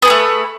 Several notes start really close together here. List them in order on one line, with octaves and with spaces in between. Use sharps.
B3 G#4 B4 A3